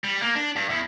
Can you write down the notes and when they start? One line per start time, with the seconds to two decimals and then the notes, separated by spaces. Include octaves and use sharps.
0.04 G3
0.22 A#3
0.36 D4
0.56 G2
0.70 E2